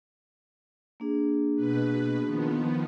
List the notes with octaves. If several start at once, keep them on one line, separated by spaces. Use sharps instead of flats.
A#3 D4 G#4
B2 B4
D#3 F3 B3